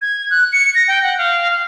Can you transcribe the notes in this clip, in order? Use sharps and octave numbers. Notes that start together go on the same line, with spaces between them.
G#6
F#6
C#7
A#6
G5
F#5
F5